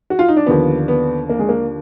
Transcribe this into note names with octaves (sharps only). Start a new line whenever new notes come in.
F#4
F4
D#4
D4
D#2 D3 F3 B3
B3
A#3
G#3
A#3